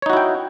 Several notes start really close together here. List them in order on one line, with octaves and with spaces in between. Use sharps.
C#5 D#4 F#4 E4 G5